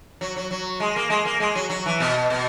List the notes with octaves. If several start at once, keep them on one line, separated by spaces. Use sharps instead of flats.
F#3
F#3
F#3
G#3
A#3
G#3
A#3
G#3
F#3
F#3
E3
B2
B2